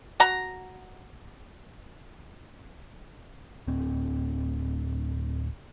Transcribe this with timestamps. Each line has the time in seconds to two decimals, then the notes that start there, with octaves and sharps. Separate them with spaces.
0.20 F#4 A#5
3.67 D1 C4